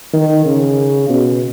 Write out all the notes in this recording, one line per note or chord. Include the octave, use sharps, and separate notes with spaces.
D#3
C#3
B2